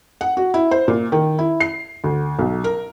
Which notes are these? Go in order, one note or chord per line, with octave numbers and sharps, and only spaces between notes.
F#5
F#4
E4
C5
A#2
D#3
E4
C7
D2
B1
A#4